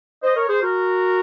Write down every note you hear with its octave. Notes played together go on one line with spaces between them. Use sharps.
C5 D#5
A#4 C#5
G#4 C5
F#4 A#4